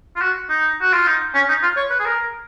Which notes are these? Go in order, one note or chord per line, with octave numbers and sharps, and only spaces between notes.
F4
F#4
D#4
F#4
F4
D#4
C#4
D#4
F4
C#5
B4
G#4
A#4